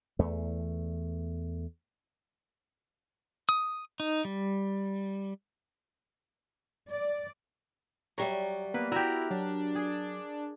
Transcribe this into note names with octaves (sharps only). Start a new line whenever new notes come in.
E2 A3
D#6
D#4
G3
D5
F#3 G3 C#5 E5 A#5
A#3 B3 B4
E4 F#4 G4 A#4
F#3 D4
G#4